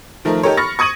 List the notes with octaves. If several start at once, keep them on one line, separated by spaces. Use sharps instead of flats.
D#3 F3 A3 A#4
D#4 G4 A4 A#4 C#5
B5 C#6 F6 A6 A#6 C#7
C#6 D#6 G#6 D#7 F#7